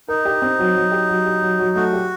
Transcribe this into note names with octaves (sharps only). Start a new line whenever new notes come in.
D#4 A#4
G4
C4
F#3
F#3
G4
F#3
G4
F#3
F#3
A3 F#4
G4